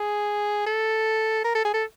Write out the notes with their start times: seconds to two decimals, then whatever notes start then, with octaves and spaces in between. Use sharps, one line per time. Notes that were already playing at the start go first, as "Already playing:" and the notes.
Already playing: G#4
0.66 A4
1.44 A#4
1.55 A4
1.65 G#4
1.74 A4